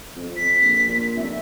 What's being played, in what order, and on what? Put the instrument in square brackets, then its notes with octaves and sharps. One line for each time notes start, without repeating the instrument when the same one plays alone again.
[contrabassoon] F2
[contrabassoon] F2 [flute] B6
[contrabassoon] A#1
A#2
[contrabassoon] F1 [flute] E5